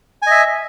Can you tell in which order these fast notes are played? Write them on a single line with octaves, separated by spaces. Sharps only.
G#5 D#5 E5